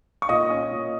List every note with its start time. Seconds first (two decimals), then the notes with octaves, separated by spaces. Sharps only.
0.22 C#6
0.29 A#2 D#5 D#6
0.50 C#4
0.71 A#2